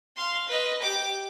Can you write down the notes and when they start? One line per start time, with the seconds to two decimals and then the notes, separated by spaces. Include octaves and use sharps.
0.16 F5 C6
0.48 B4 D#5
0.82 G4 D6